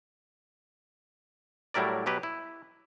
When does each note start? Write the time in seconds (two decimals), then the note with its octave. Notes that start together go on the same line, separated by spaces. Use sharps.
1.74 A2 F#3 G3 E4 A#4 D5
2.06 B2 F#3 G4 B4
2.23 E4